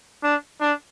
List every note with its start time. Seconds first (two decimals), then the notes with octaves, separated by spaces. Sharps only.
0.23 D4
0.61 D4